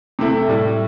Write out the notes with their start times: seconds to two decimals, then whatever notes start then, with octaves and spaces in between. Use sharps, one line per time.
0.19 C3 A3 E4
0.48 A2 G3 E4